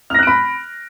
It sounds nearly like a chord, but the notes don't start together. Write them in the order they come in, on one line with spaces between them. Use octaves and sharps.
F6 A#6 F#6 D7 B5